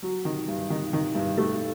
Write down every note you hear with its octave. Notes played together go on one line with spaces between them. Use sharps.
F#3
D#3
G2
D#3
D#3
G2
A3